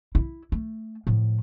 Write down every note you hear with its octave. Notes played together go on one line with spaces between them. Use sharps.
E4
A3
A2 F3